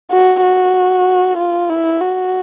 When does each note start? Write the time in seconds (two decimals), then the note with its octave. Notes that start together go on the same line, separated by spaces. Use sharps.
0.11 F#4
0.42 F#4
1.37 F4
1.69 E4
2.00 F#4